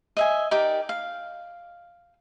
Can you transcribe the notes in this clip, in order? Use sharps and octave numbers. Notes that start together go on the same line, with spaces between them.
D#5 E5 G#5
D#4 G4 A#4 D5
F5